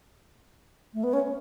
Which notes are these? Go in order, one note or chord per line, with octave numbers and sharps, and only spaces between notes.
A3
B3
C#4